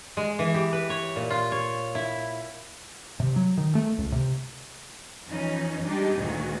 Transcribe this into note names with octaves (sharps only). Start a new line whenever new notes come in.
G#3
E3
G4
B4
C#5
A#2
F4
C#5
E4
C3
F#3
D#3
A3
C#2
C3
E2 E3 F3 C#4 D#4
G3 G#3 D4 D#4 G4
D2 A#2 D#3 G#3 F#4